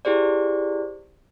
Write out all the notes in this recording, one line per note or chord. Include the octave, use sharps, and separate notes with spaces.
E4 G4 G#4 C5 D5